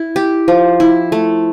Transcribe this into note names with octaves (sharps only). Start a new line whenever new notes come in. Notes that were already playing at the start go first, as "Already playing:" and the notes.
Already playing: E4
G4
F3
E4
A3